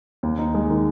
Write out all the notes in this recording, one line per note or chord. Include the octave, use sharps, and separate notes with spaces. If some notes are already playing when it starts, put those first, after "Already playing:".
D#2
D#4
G#3
D#3